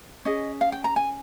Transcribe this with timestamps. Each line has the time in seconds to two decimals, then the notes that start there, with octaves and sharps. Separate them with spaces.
0.25 C#4 G#4 D#5
0.61 F5
0.72 G5
0.84 A#5
0.96 G#5